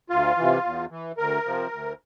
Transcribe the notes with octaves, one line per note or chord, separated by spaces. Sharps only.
D2 F4
C3 E3
E2
E3
D2 A#4
C3 F3
D2